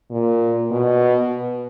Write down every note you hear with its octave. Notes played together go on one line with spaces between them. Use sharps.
A#2
B2